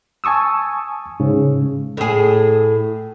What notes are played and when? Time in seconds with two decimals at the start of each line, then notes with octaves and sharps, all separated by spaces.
0.24 G#5 A5 C#6 D#6 E6
1.20 G#2 C#3
1.97 A2 G#4